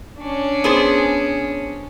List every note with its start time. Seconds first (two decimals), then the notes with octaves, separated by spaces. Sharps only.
0.19 C#4 D4
0.64 B3 G#4 C5